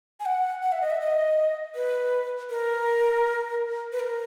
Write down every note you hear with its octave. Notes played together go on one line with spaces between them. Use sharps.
G#5
F#5
F#5
E5
D#5
E5
D#5
B4
A#4
B4
A#4